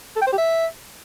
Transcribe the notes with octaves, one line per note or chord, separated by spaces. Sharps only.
A4
G5
C5
G4
E5